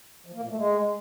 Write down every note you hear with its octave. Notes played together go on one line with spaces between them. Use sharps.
F3
A#3
A#2
A3
G#3